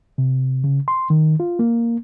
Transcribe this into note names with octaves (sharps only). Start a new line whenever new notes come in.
C3
C#3
C6
D#3
F4
A#3